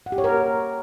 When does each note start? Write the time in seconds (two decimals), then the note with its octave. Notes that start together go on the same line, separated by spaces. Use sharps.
0.06 F#5
0.12 G4
0.18 C#5
0.24 A#4